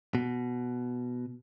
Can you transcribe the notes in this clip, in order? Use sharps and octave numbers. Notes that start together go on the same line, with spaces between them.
B2